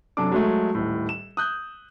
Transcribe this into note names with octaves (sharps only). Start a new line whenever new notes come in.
F#2 C3 D4 A4 D6
F#3 G#3 A3
D#1 A2
E7
D#6 F#6 G6